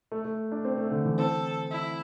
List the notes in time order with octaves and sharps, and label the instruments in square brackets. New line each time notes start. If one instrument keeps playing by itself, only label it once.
[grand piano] A3
A3
D4
C4
A3
D3
E3
[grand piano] C4 [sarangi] A4
[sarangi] E4